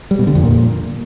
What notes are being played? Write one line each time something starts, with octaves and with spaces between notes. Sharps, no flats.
G3
B2
D3
F2
A#2